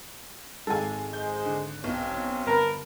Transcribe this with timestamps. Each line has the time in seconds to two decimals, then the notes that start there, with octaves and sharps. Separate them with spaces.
0.67 G#1 G#3 A4 G#5
1.13 G#3 C5 G6
1.45 D3
1.84 B1 C4 C#4
2.47 G1 A#4 B4 A5